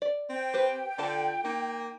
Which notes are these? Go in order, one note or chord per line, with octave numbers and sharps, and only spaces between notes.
D5
C4 G5
G4 B4 C5
D3 F4 A4 A5
A#3 D#4